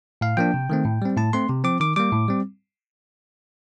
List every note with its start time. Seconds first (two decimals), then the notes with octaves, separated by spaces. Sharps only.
0.21 A2 F5
0.37 F3 A#3 D4 G5
0.54 C3
0.70 D#3 A3 C4
0.85 A2
1.02 G3 C4
1.17 A2 A5
1.33 A3 C4 C6
1.49 C3
1.64 F3 C4 D6
1.80 D#3 D6
1.96 G3 A#3 D6
2.12 A2
2.28 G3 C4